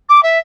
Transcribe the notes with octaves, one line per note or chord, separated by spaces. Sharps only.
D6
E5